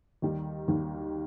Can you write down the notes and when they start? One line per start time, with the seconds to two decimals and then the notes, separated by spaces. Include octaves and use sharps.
0.22 D#2 D#3 G3
0.68 D#2 D#3 G3